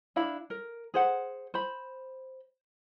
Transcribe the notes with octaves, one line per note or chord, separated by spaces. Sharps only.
D4 E4 F5 B5
A#4
G#4 C5 F#5
C5 B5